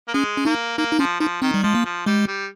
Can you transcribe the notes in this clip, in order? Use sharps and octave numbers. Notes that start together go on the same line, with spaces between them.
A#3
G#3 C#4
C#4
A#3 D#4
A#3 D#4
D#4
F3 C#4
F3 D#4
D#3 C4
G3
F3 G#3
A#3
F3
G3 G#3
G3